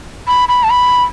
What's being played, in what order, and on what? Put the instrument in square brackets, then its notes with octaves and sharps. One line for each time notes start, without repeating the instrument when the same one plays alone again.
[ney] B5
B5
A5
B5